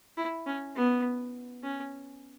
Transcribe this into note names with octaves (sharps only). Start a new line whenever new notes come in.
E4
C#4
B3
C#4